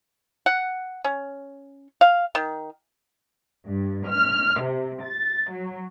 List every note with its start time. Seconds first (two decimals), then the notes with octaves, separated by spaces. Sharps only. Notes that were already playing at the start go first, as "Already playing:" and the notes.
0.46 F#5
1.04 C#4
2.01 F5
2.35 D#3
3.66 G2
4.09 F6
4.61 C3
5.03 A6
5.52 F#3